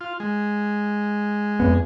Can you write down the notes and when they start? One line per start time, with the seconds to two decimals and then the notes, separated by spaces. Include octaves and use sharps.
0.01 F4
0.20 G#3
1.60 F2 B3